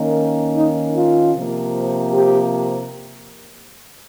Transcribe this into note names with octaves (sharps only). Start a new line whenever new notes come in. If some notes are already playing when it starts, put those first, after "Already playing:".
Already playing: D#3 A#3 C#4
D#4
F4
C3 F3 A#3
G4